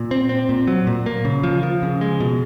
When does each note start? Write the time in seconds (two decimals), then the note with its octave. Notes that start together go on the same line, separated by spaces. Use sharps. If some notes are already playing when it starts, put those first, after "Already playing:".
Already playing: A#2
0.11 C4
0.29 C4
0.49 A#2
0.67 F#3
0.87 A#2
1.06 A#3
1.25 C#3
1.44 F3
1.63 F3
1.83 C#3
2.01 G#3
2.20 B2